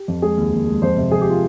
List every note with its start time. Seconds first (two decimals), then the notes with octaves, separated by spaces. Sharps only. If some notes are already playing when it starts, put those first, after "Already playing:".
Already playing: G4
0.08 F2
0.22 G#3 G#4
0.37 D#2
0.52 D#2
0.67 G#3
0.82 F2 C5
0.97 C3
1.11 F2 G#4
1.21 G4
1.30 F4